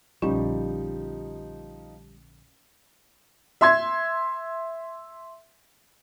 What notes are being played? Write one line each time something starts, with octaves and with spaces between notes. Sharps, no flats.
A#1 D3 F3 G3 C#4 D#4
E5 C6 G#6